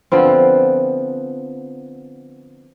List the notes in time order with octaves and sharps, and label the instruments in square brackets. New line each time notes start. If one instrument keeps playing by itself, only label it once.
[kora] D3 F3 B3 C4